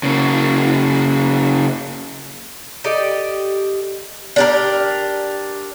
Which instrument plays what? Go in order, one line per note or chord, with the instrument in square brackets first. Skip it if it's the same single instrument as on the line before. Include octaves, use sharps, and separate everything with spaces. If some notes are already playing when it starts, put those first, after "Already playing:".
[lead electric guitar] C#3 A#3
[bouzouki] G4 A4 D5 D#5
D4 G4 A#4